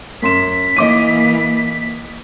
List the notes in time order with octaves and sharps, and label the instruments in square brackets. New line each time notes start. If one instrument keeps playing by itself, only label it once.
[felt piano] F#2 C6 E7 [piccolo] B6
[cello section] E3 A#3 [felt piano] D#5 D6 D#7